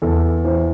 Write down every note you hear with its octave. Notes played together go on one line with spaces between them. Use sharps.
E2 A4
E3 C5